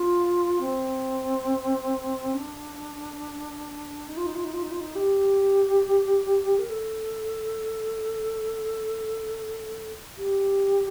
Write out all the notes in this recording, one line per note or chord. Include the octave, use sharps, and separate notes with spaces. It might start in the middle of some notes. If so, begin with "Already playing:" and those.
Already playing: F4
C4
D4
D#4
F4
D#4
F4
D#4
F4
D#4
F4
D#4
G4
A#4
A4
G4